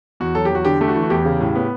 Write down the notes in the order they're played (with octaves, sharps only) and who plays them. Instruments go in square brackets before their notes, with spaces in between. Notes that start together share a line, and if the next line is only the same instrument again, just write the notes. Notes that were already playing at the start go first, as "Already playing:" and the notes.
[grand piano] E2 F#4
F#3 A4
G4
E2 F#4
D3 G4
A3 G4
F#4
E3
F#4
E2 G4
C#3
A2
B3